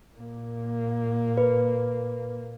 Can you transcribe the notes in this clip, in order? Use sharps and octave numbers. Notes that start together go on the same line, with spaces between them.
A#2 A#3
B4